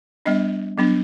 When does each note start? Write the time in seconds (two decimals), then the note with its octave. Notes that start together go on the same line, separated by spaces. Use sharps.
0.26 G3 B3 D4 D#5
0.78 F#3 B3 D4